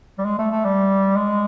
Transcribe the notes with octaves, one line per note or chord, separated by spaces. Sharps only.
G3
G#3
A3
A3
G3
G#3